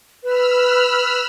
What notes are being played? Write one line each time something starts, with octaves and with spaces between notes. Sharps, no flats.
B4 B5 E6 F6